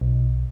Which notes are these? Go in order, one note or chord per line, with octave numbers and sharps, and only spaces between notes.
B1